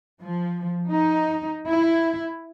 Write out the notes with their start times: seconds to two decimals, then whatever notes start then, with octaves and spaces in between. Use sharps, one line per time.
0.20 F3
0.90 D#4
1.66 E4